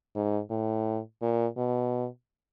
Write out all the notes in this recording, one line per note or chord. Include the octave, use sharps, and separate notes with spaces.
G#2
A2
A#2
B2